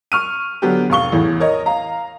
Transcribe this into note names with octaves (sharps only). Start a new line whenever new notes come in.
C#6 F6 D#7
D3 F#3 B3 D4 G4
F1 F5 C#6 G7
A1 E2 A2
A#4 C#5 D#5
F5 A#5